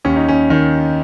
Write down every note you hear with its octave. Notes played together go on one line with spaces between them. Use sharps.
D#2 C#4
D#4
C#4
D#3